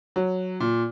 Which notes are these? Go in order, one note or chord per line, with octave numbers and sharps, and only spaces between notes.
F#3
A#2